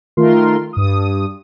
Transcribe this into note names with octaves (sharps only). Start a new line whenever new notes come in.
D#3 A3 F4 A#4 C6
G2 D#6